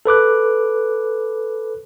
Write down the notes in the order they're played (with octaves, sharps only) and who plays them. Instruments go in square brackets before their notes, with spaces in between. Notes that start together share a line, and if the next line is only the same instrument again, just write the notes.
[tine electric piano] A4 B4 D6 F#6